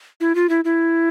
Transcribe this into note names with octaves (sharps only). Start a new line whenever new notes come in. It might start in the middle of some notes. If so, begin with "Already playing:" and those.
E4
F4
E4
E4